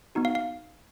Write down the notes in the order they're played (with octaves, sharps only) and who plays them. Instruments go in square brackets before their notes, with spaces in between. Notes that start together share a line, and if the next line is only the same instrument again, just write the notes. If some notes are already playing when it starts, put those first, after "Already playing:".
[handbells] B3 D#4 F#4
F5
F5